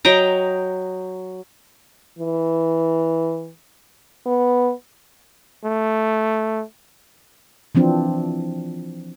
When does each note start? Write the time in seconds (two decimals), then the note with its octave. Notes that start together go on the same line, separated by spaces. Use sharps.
0.05 F#3 D#5 G5 A#5
2.19 E3
4.26 B3
5.65 A3
7.75 E3 F3 C4 D4